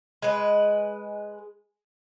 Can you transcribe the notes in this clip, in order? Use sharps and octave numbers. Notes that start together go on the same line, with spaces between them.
G#3 B4